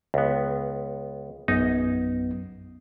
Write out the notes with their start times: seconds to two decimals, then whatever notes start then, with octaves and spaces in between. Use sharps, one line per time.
0.14 C#2 B3
1.48 A#1 F#2 B3 D#4